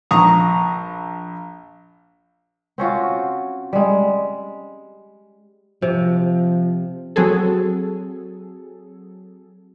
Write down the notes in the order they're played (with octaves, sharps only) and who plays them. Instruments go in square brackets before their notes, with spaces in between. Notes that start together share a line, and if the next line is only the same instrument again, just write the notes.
[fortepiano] A#1 A#5 C#6 D#6
[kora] C4 C#4 F4 F#4
G3 G#3
[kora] C3 [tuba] F3
[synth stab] F#3 C4 G#4 A4